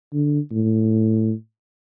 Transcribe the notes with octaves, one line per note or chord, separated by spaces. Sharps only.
D3
A2